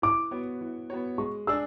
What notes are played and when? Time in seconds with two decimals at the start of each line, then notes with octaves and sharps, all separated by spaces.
0.02 E3 D6
0.31 B3 F#4 C#5
0.61 E3
0.90 B3 F#4 C#5
1.18 G#3 C#6
1.47 D4 G#4 E6